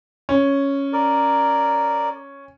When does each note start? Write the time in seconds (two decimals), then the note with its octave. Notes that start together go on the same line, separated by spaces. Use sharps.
0.29 C#4
0.93 A#4 D5